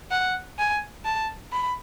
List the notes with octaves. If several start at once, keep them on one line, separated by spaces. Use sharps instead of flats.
F#5
G#5
A5
B5